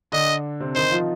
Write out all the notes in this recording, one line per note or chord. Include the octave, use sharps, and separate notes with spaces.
D3 D4 D#5
C3 C4
D#3 D#4 C5
F3 F4